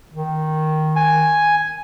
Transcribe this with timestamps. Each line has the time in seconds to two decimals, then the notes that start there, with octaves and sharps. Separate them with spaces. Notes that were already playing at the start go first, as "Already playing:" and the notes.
0.13 D#3
0.96 G#5